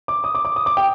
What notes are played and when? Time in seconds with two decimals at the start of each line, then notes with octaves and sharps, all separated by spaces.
0.08 D6
0.24 D#6
0.35 D6
0.45 D6
0.56 D#6
0.66 D6
0.77 G5